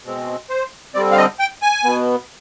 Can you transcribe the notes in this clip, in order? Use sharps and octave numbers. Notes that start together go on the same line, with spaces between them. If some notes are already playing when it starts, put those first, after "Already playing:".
B2 G#3 C4
C5
D3 G3 C4 D5
F5
D#5
G5
G#5
B2 B3